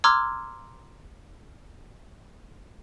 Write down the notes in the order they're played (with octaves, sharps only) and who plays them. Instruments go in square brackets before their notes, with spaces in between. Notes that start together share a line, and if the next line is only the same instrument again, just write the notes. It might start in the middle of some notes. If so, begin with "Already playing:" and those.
[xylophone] A#5 C6 D6 E6 F6 G#6